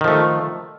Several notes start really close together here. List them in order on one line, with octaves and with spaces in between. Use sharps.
D#3 F3 A3